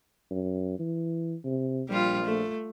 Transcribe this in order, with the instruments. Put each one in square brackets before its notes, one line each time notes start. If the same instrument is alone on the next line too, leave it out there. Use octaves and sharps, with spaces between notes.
[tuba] F#2
E3
C3
[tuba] A#1 [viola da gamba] G3 F4
[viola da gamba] A3